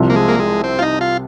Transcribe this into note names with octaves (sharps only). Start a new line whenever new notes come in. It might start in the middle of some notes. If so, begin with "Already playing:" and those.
Already playing: C2 C3 F3
A#3
G#3
A#3
G#3
C4
F4
D#4
F4